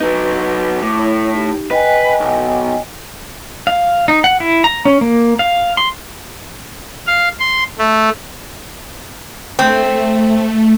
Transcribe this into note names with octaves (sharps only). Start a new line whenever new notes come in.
F#3 D#4 B4
A2 D6
E4 C#5
D#4 G4
B4 D#5 G5 G#5
B1
F5
D#4
F#5
E4
A#5
C#4
A#3
F5
C6
F5
C6
A3
A3 C4